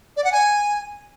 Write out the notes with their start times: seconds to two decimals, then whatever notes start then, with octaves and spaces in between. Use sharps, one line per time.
0.17 D5
0.24 F#5
0.32 G#5